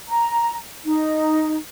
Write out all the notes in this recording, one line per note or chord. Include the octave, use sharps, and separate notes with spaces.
A#5
D#4